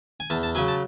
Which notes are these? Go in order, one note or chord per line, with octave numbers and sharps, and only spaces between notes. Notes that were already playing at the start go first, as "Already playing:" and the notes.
G#5
E2 A5
A5
C#3 F#3 G#5
A5